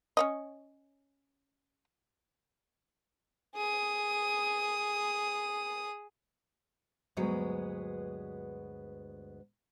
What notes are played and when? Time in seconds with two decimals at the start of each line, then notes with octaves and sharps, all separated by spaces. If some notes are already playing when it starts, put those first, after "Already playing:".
0.17 C#4 C#5 D#5
3.55 G#4 D#6
7.17 D2 G2 F#3 G#3 B3